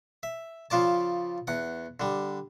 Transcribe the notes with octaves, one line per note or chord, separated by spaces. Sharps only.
E5
C#3 F3 F4 D5 A5
E2 F#5
D3 G3